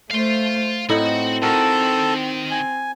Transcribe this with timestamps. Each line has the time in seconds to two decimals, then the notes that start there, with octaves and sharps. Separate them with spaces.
0.11 A3 C5 F5 C6
0.89 A2 C4 D#4 E4 F#4
1.42 D#3 F#4 A4 A#4 A5
2.51 G#5